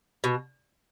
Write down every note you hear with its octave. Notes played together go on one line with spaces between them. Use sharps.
B2